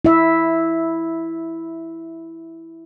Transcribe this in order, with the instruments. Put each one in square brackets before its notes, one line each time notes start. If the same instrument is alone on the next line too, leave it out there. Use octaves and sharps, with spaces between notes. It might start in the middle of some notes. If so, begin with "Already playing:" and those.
[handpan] E4 E5